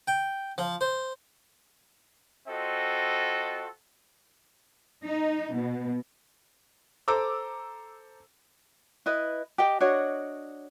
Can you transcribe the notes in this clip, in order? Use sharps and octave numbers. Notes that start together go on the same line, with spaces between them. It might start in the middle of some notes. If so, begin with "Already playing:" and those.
G5
F3
C5
C4 F4 F#4 A4 D#5
D#4
B2
A4 C5 A#5 D6 E6
E4 B4 D#5
G4 D#5 G5
D4 F#4 C#5 D#5